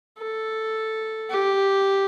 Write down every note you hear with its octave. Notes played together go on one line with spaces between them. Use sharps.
A4
G4